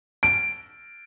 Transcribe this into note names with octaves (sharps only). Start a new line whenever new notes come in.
D7